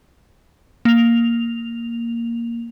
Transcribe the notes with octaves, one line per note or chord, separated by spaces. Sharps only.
A#3 F7